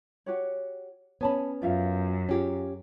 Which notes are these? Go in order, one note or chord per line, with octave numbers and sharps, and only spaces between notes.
F#4 G4 C#5
B3 C#4 C#5 A5 B5
F#2 F4 E5 F5
C#4 F4 G4 G#4